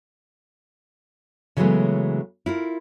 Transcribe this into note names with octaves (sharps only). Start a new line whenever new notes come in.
C#3 E3 F#3 G#3 A3 B3
E4 F4 A#4